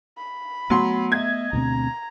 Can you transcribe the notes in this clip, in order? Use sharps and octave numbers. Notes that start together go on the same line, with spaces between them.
B5
F#3 A3 B3 C6
D#5 E5 G#6
D2 B2 C4 A#5